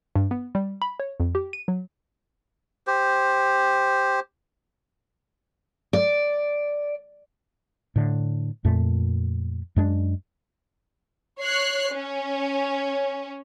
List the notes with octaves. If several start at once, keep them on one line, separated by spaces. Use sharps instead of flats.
G2
B3
G3
B5
C#5
F2
G4
D#7
F#3
G4 C5
D5
A2 D3
F2 A#2 A3
F#2 G#3 D4
C#5 F#6 C7
C#4